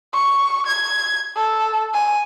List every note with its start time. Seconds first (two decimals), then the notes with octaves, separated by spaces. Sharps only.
0.14 C#6
0.67 G#6
1.36 A4
1.94 G#5